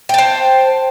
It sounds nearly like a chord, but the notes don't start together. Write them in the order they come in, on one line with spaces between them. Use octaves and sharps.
G5 A5 C5